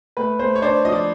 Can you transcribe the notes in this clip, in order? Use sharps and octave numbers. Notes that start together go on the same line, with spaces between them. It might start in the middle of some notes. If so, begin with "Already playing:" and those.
A3 B4
A3 C5
C#5
D4 C5 D5
F3 D#5
D5